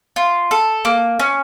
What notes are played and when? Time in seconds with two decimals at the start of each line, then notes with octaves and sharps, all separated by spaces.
0.16 F4
0.51 A4
0.85 A#3
1.19 C#4